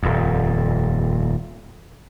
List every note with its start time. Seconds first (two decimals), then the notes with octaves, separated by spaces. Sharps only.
0.03 D#1 F2